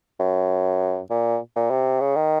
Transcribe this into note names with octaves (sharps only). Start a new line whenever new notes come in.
F#2
A#2
A#2
C3
C#3
D#3